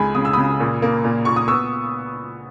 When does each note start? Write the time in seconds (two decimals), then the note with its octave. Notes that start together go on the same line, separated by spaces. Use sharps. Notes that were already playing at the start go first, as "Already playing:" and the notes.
Already playing: C#2 G#3 G#5 B5
0.15 C#3 D#6
0.25 E6
0.33 C#3 B5 D#6
0.60 A#2
0.82 A#3
1.04 A#2
1.25 A#2 C#6
1.36 D#6
1.48 B3 C#6 E6